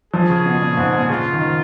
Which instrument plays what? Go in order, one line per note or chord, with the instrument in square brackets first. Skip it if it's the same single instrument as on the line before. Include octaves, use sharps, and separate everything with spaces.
[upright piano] F3 [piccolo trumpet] G#4
[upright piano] C#3
B2
A#2
G#2
A#2
[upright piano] C#3 [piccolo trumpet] F4
[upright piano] D#3